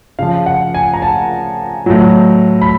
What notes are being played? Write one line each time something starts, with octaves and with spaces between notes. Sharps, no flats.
C#3 F3 F5
F#5
G#5
A#5
A5
A2 F#3
B5